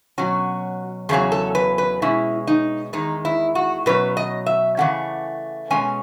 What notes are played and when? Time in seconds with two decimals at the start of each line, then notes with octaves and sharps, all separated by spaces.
0.18 B2 F#3 C#4 F#4
1.09 E2 C#3 F#3 C#4 G#4
1.32 A4
1.55 B4
1.78 B4
2.02 B2 G#3 C#4 E4
2.47 D#4
2.93 E2 D#3 G#3 D#4
3.25 E4
3.55 F#4
3.86 B2 F#3 C#4 B4
4.17 D#5
4.46 E5
4.77 C#3 E3 A3 C#4 F#5
5.70 B2 G#3 C#4 G#5